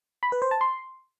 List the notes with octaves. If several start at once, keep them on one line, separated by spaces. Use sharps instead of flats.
B5
B4
C5
A5
C6